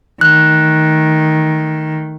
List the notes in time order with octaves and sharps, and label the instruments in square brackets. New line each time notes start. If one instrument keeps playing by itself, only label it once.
[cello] D#3 A3 [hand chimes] F#6